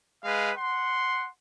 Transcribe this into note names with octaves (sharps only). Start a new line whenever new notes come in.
G#3 B4 F5
F#5 C6